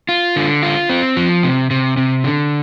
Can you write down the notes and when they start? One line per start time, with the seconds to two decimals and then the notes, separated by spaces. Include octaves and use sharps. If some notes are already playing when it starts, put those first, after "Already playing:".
0.09 F4
0.36 D3
0.63 F4
0.89 C4
1.17 F3
1.43 C3
1.70 C3
1.97 C3
2.24 D3